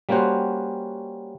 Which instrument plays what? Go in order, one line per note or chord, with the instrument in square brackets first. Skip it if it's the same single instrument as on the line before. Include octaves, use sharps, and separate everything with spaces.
[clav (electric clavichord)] G3 A#3 C#4 F#4 C5 F#5